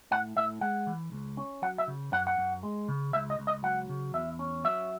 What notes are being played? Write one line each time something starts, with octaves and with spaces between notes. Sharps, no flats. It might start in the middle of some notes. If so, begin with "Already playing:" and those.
A2 F#5
A2 E5
G#3 F#5
E3
C#2
C#4
F#3 F#5
E5
C#3
F#2 F#5
F#5
F#2
G#3
C#3
C#2 E5
D#5
C#2
D#5
F#3 F#5
C#3
E2 E5
C#4
F#3 E5